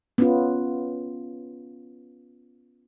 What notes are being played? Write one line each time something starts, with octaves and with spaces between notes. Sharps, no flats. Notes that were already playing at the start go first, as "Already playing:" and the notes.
B3 C#4 F4